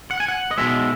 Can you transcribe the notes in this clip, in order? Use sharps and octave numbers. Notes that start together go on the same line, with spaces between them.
F#5
G#5
F#5
D#5
B1 B2 G#3 E5